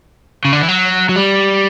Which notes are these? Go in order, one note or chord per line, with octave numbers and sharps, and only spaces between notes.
C#3
D3
E3
F#3
F#3
G3